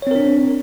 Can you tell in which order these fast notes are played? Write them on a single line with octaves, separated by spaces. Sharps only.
C#5 C4 A#4 D4